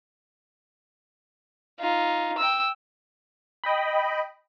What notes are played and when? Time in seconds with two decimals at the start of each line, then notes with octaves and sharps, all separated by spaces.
1.80 D#4 F4
2.38 G5 E6
3.64 D#5 G5 B5